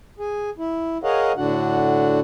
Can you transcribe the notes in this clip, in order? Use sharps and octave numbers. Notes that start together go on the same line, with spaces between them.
G#4
E4
G#4 A#4 C#5 D#5 F5 F#5
A2 D3 D4 F#4 F#5